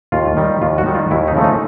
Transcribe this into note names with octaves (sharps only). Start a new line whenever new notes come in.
D#2 F4
D#3 G3
D#2 F4
F#4
D#3 G3
F4
D#2 E4
D#4
C#3 F3 A3
D#4